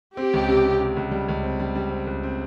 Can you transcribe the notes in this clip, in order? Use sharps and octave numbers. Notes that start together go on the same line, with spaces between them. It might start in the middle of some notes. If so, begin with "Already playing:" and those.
C4 G4
C#2
C3
C3
C3
C#2
G3
C#2
C4
G3
G3
C4
C#2
C4